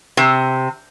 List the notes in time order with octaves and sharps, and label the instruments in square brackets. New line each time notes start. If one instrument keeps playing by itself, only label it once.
[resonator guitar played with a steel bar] C3